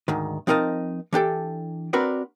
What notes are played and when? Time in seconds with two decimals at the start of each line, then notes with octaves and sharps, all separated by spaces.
0.08 D2 G#2 D#3
0.47 F3 C4 D#4 A#4 D#5 A5
1.13 E3 D4 G4 A4
1.93 C4 D4 F#4 A#4 B4 D5